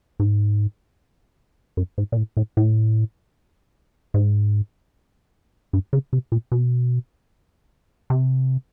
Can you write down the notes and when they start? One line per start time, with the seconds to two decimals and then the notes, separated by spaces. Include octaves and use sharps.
0.19 G#2
1.77 F#2
1.98 G#2
2.12 A#2
2.17 A2
2.37 A2
2.57 A2
4.14 G#2
5.73 G2
5.93 C#3
6.13 C3
6.32 A#2
6.52 B2
8.10 C3